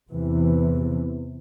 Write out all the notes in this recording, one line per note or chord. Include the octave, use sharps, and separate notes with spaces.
E2 C3 E3